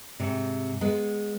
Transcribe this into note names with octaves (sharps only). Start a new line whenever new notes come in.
G#2 C3
G#3 B3